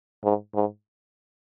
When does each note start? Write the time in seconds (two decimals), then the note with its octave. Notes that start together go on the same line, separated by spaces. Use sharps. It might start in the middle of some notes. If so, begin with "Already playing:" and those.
0.24 G#2
0.55 G#2